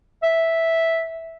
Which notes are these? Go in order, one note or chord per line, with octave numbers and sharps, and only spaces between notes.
E5